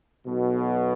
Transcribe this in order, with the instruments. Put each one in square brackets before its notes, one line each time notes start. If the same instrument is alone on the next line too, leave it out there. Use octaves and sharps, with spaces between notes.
[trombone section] B1 B2